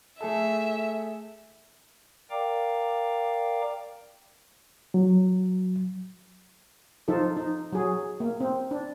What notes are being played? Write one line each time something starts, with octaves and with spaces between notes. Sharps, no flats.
A3 G#4 A4 E5
A#4 D5 F5 G5 A#5 D6
F#3
F3 D#4 F4 A4
D#4
F#3 G#4
A#3
C4
D4